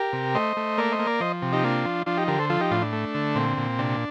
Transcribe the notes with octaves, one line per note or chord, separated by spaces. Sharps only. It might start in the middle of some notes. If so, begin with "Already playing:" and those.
Already playing: G4 A#4
C3
A3 C5 D#5
A3
A#3 A#4 D5
C5 D#5
A#3
A#4 D5
F3 C5 D#5
C3
D#4 G4
A#3 D4 F4
F3
F3 D4 F4
D#4 G4
D3 G4 A#4
A4 C5
F3 F4 A4
D#4 G4
A2 D4 F4
D4
A3
D3
A#2 C4
A#2
C3 D4